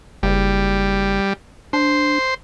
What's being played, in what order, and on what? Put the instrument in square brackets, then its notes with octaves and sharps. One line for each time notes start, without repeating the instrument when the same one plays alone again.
[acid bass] F#1 [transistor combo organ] G3
[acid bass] D4 [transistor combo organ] C5